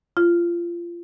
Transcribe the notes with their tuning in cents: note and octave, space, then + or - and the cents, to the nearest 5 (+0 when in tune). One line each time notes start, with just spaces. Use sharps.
F4 -25